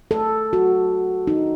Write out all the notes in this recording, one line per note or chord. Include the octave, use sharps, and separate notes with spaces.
A4
F#4
D#4